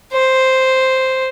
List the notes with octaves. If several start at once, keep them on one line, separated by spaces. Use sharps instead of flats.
C5